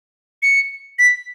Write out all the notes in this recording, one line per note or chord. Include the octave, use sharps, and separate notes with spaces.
C#7
B6